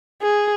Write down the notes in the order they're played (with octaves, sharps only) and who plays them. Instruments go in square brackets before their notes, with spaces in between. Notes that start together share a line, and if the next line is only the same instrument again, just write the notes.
[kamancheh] G#4